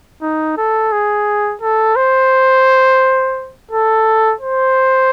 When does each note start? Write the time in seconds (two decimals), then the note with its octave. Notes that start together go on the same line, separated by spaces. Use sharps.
0.22 D#4
0.57 A4
0.92 G#4
1.61 A4
1.96 C5
3.71 A4
4.41 C5